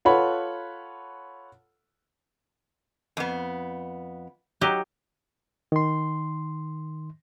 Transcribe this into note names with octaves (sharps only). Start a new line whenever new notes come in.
F4 A4 B4 C#5 F#5 B5
F2 B3
F#3 D#4 G4
D#3 C6